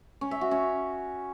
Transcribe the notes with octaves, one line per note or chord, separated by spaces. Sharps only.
C#4
E5
F#4
C#4